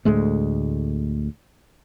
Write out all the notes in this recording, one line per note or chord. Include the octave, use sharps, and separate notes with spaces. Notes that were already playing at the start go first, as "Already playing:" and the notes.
D2 A2 G#3 A3